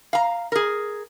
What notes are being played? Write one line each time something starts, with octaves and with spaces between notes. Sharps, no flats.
F5 A#5
G#4 A#4